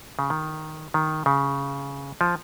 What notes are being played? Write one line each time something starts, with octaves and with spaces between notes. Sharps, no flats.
C#3
D#3
D#3
C#3
F3